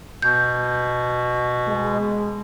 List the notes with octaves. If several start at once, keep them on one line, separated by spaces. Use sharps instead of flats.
B2 G6
G#3